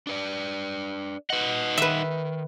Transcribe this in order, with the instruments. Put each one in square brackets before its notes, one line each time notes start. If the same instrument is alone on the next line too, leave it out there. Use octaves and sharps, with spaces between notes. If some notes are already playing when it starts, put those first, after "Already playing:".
[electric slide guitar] D4 B4 D5
[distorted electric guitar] D#4 F#5 [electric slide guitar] B4 D#5
[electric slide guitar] D#3 [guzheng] B4 E5